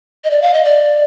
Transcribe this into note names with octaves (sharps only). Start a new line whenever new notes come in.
D#5
D5
F5
D#5
D5